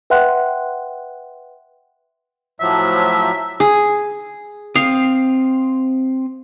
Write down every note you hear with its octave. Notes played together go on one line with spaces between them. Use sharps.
B4 E5 F#5 G5 C6 F#6
A2 F3 F#3 E5
G#4
C4 F5 D#6